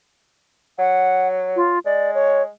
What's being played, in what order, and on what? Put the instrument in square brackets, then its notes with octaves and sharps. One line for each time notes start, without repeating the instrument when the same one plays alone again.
[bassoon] F#3 [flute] F#5
[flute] F4
[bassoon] G#3 [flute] D5
[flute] C#5